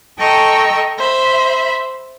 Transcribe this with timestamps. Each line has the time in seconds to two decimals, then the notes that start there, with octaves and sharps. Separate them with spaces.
0.18 A4 D#5 G5 A#5 C#6 E6
0.98 C5 E5 B5